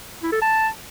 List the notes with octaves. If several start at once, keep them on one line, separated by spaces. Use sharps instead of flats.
E4
A4
A5